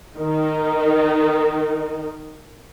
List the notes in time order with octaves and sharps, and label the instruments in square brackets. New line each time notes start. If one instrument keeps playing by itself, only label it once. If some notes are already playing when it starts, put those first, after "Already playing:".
[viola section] D#3 D#4 A#4